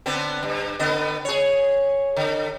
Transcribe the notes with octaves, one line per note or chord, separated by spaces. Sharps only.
D3 B3 C4
G2
D3 B3 D#5
G#4 C#5
D3